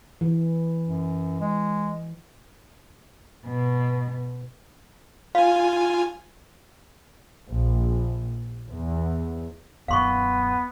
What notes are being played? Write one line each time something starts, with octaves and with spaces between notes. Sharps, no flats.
E3
F#2
G#3
B2
F4 F5 G#5
A#1
E2
D#1 F#2 B3 F5 C6 C#6